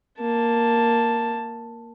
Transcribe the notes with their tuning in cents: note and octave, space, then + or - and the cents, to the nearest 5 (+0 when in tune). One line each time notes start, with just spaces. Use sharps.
A#3 +0 A5 +5